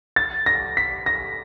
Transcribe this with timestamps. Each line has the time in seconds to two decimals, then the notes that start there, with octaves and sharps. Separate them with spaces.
0.16 A6
0.46 A#6
0.77 B6
1.06 A#6